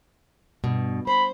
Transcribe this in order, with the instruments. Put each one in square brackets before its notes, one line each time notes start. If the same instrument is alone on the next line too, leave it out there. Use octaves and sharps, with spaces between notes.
[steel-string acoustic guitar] G2 B2
[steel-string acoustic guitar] C5 [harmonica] B5